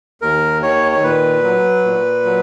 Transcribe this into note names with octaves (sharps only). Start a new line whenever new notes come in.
D#2 A#4
D#3 C#5
C#5
A#2 B4
F#3
A#2
F#3